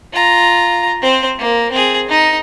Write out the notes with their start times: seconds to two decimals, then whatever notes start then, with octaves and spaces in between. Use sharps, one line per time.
0.13 F4 A#5
1.02 C4 C5
1.39 A#3
1.72 C4 G#4
2.08 D#4